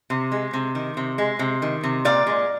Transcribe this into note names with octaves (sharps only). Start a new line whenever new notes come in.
C3
G#3
C3
D#3
C3
G#3
C3
D#3
C3
A#2 D5 F5
G#3